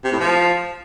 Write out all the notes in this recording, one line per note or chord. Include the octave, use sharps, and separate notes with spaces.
C3
A2
F3